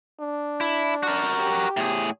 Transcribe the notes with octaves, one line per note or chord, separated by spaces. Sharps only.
D4
E4
F#4 A#4
G4
A2 G#4